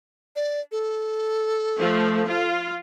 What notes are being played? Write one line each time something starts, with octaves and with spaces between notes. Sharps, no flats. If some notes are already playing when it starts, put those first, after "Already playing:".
D5
A4
F3 A3
F4